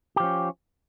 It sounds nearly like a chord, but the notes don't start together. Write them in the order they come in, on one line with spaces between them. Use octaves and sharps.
G4 F3 C#4